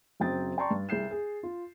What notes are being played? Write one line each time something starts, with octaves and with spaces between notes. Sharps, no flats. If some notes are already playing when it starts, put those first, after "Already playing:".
F#1 F#3 C4 G5 D#6 A6
D5 G5 A5 A#5 C6 C#6
G2
C2 G#4 G6 C7 E7
G#4
F4